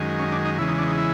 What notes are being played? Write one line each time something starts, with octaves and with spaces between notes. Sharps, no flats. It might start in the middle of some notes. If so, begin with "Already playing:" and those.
Already playing: F#2 D#3 G#3
C#4
D4
D#4
E2 C#3 E3 G#3 E4
D#4
D4
D#4
E4